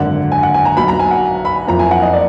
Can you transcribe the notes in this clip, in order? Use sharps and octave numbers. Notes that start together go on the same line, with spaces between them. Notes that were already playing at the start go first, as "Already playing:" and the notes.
Already playing: G#1 F#2 D3 F#5
G#5
F#5
G#5
A#5
B1 B2 F#3 B5
A#5
G#5
F#5
B5
F#1 F2 F3 A#5
G#5
F#5
D#5
D5